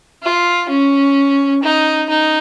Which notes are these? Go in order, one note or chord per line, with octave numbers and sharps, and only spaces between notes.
F4
C#4
D#4
D#4